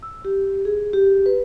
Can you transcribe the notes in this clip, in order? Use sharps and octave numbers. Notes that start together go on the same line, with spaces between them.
E6
G4
G#4
G4
B4